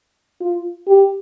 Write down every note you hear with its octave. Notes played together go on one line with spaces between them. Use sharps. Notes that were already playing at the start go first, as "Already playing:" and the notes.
F4
G4